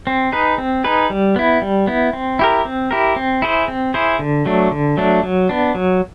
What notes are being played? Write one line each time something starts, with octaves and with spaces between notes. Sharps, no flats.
C4
D#4 G#4 B4
C4
D#4 G#4 B4
G3
B3 E4
G3
B3 E4
C4
E4 G4 A#4
C4
E4 G4 A#4
C4
E4 G#4 C5
C4
E4 G#4 C5
D3
F#3 A3 D4
D3
F#3 A3 D4
F#3
B3 D4
F#3